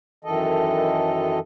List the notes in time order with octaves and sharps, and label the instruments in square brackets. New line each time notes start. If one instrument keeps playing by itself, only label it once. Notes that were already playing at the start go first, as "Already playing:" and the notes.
[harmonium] F#2 D#3 E3 A4 D#5